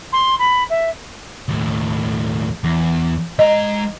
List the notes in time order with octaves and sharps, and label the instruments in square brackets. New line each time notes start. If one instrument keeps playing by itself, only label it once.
[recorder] C6
B5
E5
[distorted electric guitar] D#2 A2
E2
[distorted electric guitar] G#3 A#5 [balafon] D#5